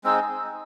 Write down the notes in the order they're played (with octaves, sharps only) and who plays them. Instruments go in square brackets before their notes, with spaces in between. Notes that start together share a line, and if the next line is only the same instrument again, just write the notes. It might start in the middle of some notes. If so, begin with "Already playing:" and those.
[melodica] G#3 C4 D#4 G#4 [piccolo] E6